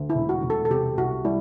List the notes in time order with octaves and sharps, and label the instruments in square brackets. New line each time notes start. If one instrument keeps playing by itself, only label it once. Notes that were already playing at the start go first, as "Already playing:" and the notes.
Already playing: [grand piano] D2
[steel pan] E4
[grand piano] E1
[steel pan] F#4
[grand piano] E1
[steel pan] A4
A4
[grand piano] C3 [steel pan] G4
[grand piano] C2 [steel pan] F#4
[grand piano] G3 [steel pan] E4